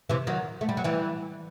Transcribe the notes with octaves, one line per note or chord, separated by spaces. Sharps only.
C3 E3
D#3 F#3
A3
G3
F#3
E3 G3